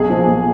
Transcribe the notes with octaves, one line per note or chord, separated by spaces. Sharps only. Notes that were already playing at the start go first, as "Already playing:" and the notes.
Already playing: B1 G#4
A#2 F3
B1